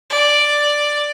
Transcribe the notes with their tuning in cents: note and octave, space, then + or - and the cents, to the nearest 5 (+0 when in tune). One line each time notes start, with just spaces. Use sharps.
D5 +0